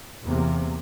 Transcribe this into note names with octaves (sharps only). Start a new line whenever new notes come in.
E2 C3 A#3